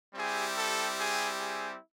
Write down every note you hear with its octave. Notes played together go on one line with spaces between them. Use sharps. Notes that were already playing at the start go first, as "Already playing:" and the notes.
G3 C4 E4 G4 G#4
A4
G#4
G#4